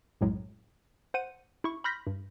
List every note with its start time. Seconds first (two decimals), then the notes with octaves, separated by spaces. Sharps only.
0.21 B1 F#2 A2 F#3 G#3
1.14 C5 F#5 D#7
1.64 E4 C#6
1.84 B5 C6 F6 G6 A#6 B6
2.07 G2